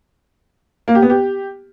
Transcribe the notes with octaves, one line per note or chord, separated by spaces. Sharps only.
A#3
G4
B3
G4